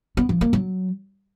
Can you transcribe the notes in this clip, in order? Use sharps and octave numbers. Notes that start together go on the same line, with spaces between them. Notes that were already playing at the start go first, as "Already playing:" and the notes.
B3
F3
A#3
F#3